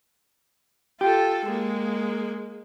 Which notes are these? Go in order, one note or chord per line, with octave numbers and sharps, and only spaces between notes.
F4 G4 A4
G#3 A#3